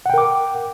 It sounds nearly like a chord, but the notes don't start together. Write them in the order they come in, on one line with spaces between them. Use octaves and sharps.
F#5 G5 A#4 D6